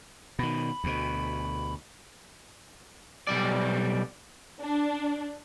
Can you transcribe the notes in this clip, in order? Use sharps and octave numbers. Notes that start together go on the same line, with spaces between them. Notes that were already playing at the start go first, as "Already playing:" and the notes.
B2 D#3 B5
D2 B2
B1 G3 D5
D4